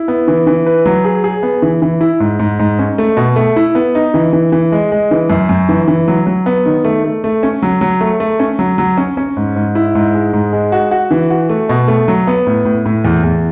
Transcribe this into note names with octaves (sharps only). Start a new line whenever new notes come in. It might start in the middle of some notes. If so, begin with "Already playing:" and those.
Already playing: E4
B3
E3
E3
B4
F#3
G#4
G#4
B3
E3
E3
E4
G#2
G#2
G#2
C#4
A3
B2
A3
E4
B3
D#4
E3
E3
E3
G#3
G#3
E3
F#2
F#2
E3
E3
F#3
F#3
B3
D#3
A3
A3
A3
C#4
F#3
F#3
A3
A3
C#4
F#3
F#3
C#4
C#4
G#2
G#2
E4
G#2
G#3
G#2
G#3
F#4
F#4
E3
F#4
A3
B2
A3
F#3
B3
A2
A2
A2
E2
E2